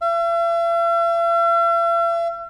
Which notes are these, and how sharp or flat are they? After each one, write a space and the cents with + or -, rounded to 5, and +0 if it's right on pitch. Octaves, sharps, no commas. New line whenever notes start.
E5 +45